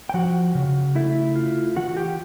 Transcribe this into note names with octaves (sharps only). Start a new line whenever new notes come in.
G5
F3 F#4 F#5
C#3
A3 E4 E5
F4
E3 F#4 F#5
G4 G5